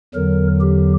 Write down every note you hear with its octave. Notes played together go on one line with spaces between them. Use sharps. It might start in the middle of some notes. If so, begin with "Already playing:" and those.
E2 D3 F#3 A#4
G4